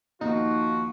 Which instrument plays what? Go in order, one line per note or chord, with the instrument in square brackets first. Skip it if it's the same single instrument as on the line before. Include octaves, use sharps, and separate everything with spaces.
[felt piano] D#2 A#3 [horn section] F3 F#4 [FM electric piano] D#4